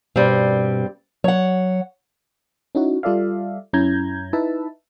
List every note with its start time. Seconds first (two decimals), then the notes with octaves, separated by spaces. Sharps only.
0.16 G2 B2 G3 C4
1.24 F#3 C#5 F#5
2.75 C#4 D#4 E4 F#4
3.03 G3 F4 A4 D5 E5 F5
3.73 F#2 C#4 E4 A#5 G6 G#6
4.33 D#4 E4 B4 E5 A5